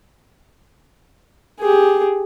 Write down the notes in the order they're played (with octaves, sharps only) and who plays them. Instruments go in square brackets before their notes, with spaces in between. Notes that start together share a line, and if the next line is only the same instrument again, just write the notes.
[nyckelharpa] G4 G#4